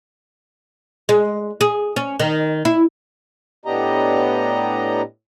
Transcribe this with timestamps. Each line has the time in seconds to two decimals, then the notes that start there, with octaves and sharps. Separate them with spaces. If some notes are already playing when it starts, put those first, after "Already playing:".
1.09 G#3
1.61 G#4
1.96 C#4
2.20 D#3
2.65 E4
3.66 A2 B3 D4 G4 D#5 A#5